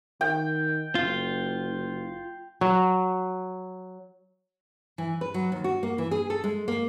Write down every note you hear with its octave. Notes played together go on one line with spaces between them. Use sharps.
D#3 G5
F#1 F4
F#3
E3
B4
F#3
D#2
F#4
A#3
E3
G#4
A4
G#3
A#3